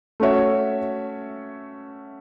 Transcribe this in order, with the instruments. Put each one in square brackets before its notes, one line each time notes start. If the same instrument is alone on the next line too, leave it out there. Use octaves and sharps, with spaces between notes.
[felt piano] A3 C#4 F#4 C#5 E5